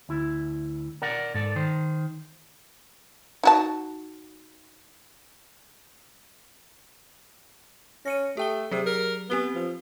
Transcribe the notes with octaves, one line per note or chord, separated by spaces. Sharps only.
D2 E4
A#4 D5 F#5
G#2 A4 D5
D#3 C5
D#4 F#4 A5
C#4 A#6 C#7 D#7
A3 G4 G5 G7
C3 F#3 G4 G#4
A#4
B3 C4 G4 G7
F3